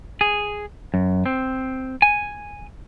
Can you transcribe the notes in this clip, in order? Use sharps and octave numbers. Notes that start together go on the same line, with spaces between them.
G#4
F#2
C4
G#5